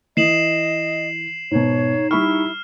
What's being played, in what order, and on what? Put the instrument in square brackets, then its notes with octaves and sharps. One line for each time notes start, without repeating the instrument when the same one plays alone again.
[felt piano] E3 [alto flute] D#5 [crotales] C7 E7 F#7
[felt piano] G#2 B2 [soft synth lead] D#4 [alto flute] C#5
[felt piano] G3 B5 C#6 [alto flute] E4 [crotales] F6